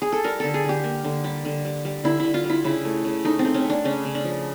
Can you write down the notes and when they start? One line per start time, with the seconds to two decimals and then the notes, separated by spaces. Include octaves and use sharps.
0.02 G#4
0.12 A4
0.24 G3 A#4
0.40 D3 A4
0.54 G#4
0.65 D3 G4
0.84 A#3
1.04 D3
1.24 G3
1.45 D3
1.65 G3
1.85 G3
2.04 D3 E4
2.20 D3 E4
2.34 F4
2.44 G3
2.50 E4
2.64 C#3 E4
2.85 A3
3.04 C#3
3.25 A3 D#4
3.39 C4
3.45 A3
3.54 C#4
3.64 A3
3.70 D4
3.84 C#3 C#4
4.05 C#3
4.15 D4
4.24 F3